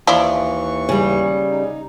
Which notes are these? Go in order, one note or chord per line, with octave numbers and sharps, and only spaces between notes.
D#2 E3 F3 E4 D5 C#6
C#3 G3
D#4